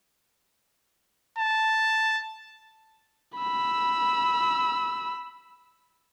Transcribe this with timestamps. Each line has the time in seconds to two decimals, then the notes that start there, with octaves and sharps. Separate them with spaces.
1.39 A5
3.38 B5 E6